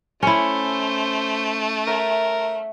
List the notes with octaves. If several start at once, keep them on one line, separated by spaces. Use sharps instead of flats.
A3 C#4 E4 C5
A#4 C#5 E5 F#5